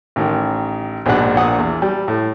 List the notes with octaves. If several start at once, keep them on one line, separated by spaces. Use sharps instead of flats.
A1 D#3
A#1 G#2 B2 D4 F#5 F#6
A#1 A#2 F#5 D#6
E2
G3
A2